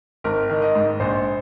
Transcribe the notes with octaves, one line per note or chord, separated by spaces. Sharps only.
G#1 A#4
D#3
D#5
G#2
A#1 C5